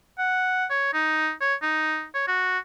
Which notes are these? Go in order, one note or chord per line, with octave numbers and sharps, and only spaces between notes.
F#5
C#5
D#4
C#5
D#4
C#5
F#4